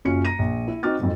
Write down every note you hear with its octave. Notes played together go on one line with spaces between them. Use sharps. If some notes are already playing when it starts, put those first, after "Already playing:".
F#1 C#4 F4 F#4 C#5 C#7
A#5 A#6 D#7
A#1
E4
C4 D#4 F#4 D6 F6 A6
F2 G#2 F#3